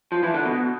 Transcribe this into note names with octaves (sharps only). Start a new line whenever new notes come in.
F3
E3
D3
B2